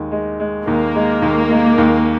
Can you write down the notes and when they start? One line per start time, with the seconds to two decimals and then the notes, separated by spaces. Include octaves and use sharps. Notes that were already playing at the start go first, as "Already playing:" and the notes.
Already playing: D#2 G#3
0.11 G#3
0.40 G#3
0.67 D#2 A#3
0.95 G#3
1.22 D#2
1.51 G#3
1.78 D#2